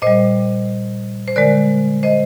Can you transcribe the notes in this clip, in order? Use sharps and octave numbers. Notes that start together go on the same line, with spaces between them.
A#2 G3 C5 D#5
C5
D3 G#3 A#4 D5
C5 D#5